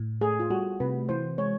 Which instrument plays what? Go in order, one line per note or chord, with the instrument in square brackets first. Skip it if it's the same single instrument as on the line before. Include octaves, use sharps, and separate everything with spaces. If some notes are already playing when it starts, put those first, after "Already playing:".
Already playing: [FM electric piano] A2
[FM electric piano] A3 [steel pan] G#4
[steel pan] F4
[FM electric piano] G3 [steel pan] F#4
[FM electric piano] C3 [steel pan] B4
[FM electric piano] E3 [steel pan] C5
[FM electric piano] G#3 [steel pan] C#5